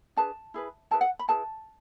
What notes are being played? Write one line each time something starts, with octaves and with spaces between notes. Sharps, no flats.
D4 G#4 B4 A5
E4 G#4 B4
E4 G#4 B4 A5
F#5
B5
E4 G#4 B4 A5